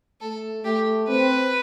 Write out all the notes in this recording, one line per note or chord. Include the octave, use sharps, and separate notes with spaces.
A3 A4
A3 G4
C4 B4